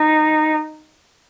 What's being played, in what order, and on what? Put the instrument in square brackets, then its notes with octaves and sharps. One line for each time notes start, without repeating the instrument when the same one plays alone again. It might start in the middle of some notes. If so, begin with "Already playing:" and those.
Already playing: [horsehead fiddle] D#4